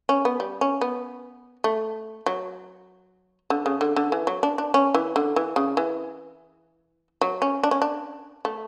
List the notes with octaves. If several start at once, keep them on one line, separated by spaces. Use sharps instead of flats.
C#4
B3
G3
C#4
B3
A3
F#3
D3
C#3
D3
D3
E3
F#3
D4
D4
C#4
E3
D3
E3
C#3
E3
F#3
C#4
D4
C#4
D4
A3